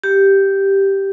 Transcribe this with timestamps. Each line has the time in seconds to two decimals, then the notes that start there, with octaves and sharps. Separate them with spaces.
0.04 G4